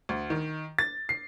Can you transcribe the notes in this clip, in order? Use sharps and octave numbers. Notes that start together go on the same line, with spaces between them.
D2
D#3
A6
C7